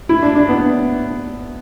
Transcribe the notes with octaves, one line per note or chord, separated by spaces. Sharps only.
E4
D4
D4
B3